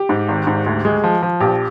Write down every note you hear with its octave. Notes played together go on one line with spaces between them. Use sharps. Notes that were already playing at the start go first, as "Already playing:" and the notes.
Already playing: G4
G#2
G#1
G#2
D2
G#3
F3
F3
A#1 G4